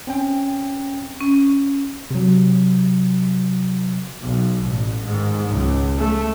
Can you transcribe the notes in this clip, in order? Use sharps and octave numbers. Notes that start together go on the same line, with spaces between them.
C4 C#4 G5
C#4
C3 F#3
B1
A1
G#2 D#3
C#2
A3